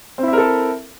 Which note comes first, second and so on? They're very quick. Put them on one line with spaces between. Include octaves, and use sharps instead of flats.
C4 E4 E5 A#4 A4